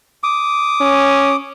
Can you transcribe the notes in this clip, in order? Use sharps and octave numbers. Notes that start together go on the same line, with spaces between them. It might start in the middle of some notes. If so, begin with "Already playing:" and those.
D6 D#6
C#4